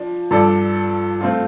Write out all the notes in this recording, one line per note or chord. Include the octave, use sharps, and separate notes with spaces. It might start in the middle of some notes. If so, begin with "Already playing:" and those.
Already playing: F3 D4
G2 F3 D4 A4 D5
F3 A3 C4 F4